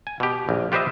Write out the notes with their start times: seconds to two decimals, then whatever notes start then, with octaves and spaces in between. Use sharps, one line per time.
0.07 G#5
0.20 B2 G4
0.49 A#1
0.72 F4 G4 B4 C5 D#5 E5